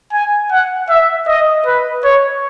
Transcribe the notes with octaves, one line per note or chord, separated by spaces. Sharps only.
G#5
F#5
E5
D#5
B4
C#5